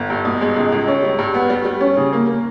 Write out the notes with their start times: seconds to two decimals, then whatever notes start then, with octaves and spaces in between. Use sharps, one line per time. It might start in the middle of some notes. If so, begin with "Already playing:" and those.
Already playing: G1
0.10 G2
0.25 B2
0.41 G#3
0.56 C#2
0.72 C#2
0.88 C#4
1.02 G3
1.18 G2
1.34 B3
1.50 G3
1.65 G3
1.81 C#4
1.97 C#3
2.13 A#3
2.27 A#3